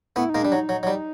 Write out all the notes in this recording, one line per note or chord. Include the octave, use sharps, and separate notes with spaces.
A3 B3 E4
D#4
G#3 A#3
G3 D4
F#3
D#4
F#3
F#3
G3